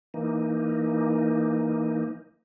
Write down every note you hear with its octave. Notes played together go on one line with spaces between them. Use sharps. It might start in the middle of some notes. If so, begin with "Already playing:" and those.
E3 A#3 D#4